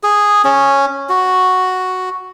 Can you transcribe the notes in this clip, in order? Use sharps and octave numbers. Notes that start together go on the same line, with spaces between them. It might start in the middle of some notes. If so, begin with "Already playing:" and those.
G#4
C#4
F#4